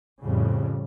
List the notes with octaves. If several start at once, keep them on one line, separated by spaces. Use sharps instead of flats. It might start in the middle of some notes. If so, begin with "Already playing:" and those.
F2 A2 C#3 G3